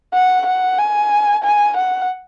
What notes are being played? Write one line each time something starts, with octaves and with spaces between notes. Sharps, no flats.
F#5
F#5
G#5
G#5
F#5